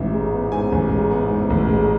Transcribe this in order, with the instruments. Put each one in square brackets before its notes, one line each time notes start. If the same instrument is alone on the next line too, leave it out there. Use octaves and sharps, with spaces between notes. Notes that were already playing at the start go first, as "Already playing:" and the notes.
Already playing: [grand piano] A1 G#2 E5
G#3
B3
G#2 G#5
A1
G#3
B3
G#2
A1
G#3